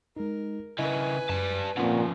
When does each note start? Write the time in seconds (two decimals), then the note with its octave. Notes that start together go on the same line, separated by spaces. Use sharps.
0.16 G#3 D#4 A#4
0.78 C#3 E4 B4 D#5 G#5
1.29 F#2 G3 A5
1.77 A#2 C#3 F3 C4 F#5